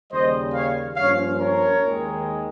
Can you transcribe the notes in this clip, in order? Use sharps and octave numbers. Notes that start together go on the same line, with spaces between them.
D#2 C#3 G3 C5 D#5
C#5 F5
G2 F3 A#3 C#4 C#5 F5
A#4 C#5
D#2 D#3 G#3